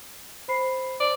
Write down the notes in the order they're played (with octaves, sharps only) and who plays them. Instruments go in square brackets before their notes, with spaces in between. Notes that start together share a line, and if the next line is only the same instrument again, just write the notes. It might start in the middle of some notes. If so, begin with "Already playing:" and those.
[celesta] C5 B5 C7
[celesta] C5 [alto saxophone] D5